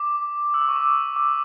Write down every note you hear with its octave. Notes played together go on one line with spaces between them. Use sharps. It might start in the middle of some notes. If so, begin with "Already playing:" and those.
Already playing: D6
E6
D6
C#6
D6
D6